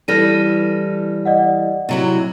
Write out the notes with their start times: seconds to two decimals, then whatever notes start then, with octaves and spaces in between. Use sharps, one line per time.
0.08 E3 G3 A4 F6 A#6 D#7
1.25 D5 D#5 F#5
1.89 C3 F#3 E4